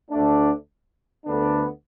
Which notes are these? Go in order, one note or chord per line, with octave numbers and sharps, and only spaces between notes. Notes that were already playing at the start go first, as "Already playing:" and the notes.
D2 D3 A3 D4
D2 D3 B3 D4